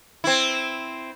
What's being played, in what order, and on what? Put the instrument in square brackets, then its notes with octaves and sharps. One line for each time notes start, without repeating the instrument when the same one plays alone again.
[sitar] C4 E4